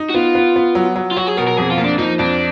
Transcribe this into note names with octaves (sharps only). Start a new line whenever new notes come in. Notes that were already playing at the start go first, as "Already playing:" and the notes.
Already playing: D#4
F#4
B3 F4
B3
B3
F#3
F#3
F4
F#3 F#4
G#4
B2 A#4
A#4
F2 G#4
F4
A#3
D4
F3 D#4
F2 D4